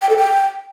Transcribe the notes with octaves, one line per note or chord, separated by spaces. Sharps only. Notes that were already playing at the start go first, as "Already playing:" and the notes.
G5
A4
G5